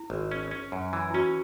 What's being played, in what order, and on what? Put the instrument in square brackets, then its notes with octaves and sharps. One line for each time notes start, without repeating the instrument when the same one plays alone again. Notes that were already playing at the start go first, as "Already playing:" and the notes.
Already playing: [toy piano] E4
[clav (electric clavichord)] G#1
C#4
C#4
F#2
E3
[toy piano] E4
[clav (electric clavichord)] C#4 [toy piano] F#4